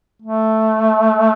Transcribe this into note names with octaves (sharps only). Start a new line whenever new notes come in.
A3